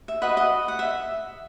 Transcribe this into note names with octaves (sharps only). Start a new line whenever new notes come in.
E5
F#4 B4 D#5 F#5
D#5
F#5
E5